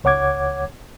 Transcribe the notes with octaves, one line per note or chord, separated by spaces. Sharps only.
C#2 C#5 F#5 D6 G#6